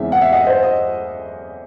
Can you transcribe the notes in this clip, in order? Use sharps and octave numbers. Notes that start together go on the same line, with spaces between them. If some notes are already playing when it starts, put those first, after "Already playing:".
Already playing: E2 C#3 E3 G#3 C4 E5
F#5
E5
D#5 F#5
C5 D#5
D#5